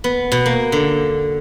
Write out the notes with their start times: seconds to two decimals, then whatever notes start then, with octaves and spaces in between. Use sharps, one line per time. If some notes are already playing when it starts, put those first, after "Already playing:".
0.04 B3
0.32 B2
0.46 A#3
0.72 D3